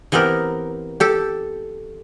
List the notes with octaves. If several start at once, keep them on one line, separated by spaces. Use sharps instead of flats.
E3 B3 C4 G4 A#4
G4 A4